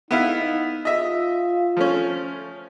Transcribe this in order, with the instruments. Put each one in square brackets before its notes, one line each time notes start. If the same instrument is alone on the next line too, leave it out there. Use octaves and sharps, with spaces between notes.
[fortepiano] B3 E4 F5 [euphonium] D#4
[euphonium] F4 [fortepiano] D#5 E5
[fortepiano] F3 A3 C#4